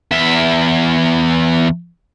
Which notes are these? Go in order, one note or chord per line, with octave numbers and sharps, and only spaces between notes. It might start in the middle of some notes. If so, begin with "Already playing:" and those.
E2 E5